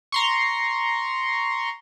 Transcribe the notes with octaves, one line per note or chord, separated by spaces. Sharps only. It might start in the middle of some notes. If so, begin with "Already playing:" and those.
A#5 C6 C#6